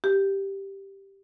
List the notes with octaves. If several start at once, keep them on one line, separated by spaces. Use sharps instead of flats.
G4